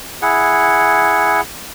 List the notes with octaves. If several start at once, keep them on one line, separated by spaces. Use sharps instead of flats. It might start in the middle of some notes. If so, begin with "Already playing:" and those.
E4 G#4 F#5